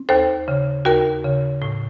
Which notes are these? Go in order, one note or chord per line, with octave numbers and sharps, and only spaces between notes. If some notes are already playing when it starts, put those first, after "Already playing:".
Already playing: C4
D#2 A4 C5
C#3
D#2 F#4 A#4
C#3
A2